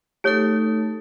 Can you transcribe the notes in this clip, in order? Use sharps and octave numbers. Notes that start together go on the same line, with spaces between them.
A3 D#4 G4 A4 C#5